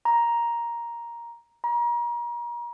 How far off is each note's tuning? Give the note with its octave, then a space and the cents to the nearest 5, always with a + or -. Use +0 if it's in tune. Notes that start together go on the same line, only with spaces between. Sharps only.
A#5 +10
A#5 +35